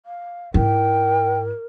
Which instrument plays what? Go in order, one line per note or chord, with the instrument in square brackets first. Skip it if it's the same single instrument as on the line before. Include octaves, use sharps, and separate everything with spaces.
[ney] F5
[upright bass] G#2 E4 [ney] A#4 [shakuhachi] G5